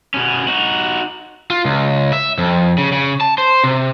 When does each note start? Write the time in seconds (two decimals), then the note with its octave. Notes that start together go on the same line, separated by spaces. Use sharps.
0.14 B2 C#4
0.48 D#4 F#4
1.50 F4
1.65 C#2
2.13 E5
2.38 F2
2.78 C#3
2.92 C#3
3.21 A5
3.38 C5
3.64 C3